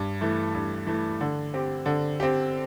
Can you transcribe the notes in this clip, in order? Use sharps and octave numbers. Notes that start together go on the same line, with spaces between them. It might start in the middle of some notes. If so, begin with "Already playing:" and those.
Already playing: G2
E3 A3
G2
E3 A3
D3
C4 G4
D3
C4 G4